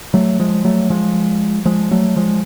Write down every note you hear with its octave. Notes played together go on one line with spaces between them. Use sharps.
F#3 A3
F3 G#3
F#3 A3
F3 G#3
F3 G#3
F#3 A3
F3 G#3